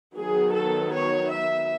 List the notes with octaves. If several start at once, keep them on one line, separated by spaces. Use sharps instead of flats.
D#3 F#3 B3 G#4
A4
C#5
E5